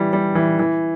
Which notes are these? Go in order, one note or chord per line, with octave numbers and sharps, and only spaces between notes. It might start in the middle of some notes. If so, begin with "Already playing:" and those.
Already playing: E3 G3
G3
E3
E3